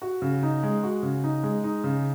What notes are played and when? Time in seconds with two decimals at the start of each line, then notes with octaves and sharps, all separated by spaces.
0.02 F#4
0.22 C#3
0.43 D#4
0.63 G#3
0.83 F#4
1.03 C#3
1.24 D#4
1.43 G#3
1.64 D#4
1.84 C#3